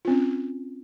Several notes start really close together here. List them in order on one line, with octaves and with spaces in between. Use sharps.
F4 C4 C#4